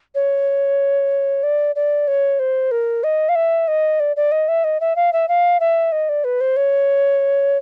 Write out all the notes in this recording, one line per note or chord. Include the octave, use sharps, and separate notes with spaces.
C#5
D5
D5
C#5
C5
A#4
D#5
F5
E5
D#5
D5
D5
D#5
E5
D#5
E5
F5
E5
F5
E5
D#5
D5
B4
C5
C#5